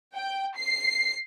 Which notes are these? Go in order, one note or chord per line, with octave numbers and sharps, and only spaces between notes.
G5
C7